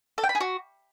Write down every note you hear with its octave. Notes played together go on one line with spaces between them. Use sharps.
A4
G5
B5
G#4
F#4